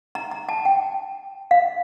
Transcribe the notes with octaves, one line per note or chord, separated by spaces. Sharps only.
A#5
A#5
A5
G5
F5